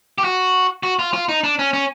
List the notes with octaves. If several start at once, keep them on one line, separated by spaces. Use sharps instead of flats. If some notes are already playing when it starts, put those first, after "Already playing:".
G4
F#4
F#4
F4
F4
D#4
D4
C#4
C#4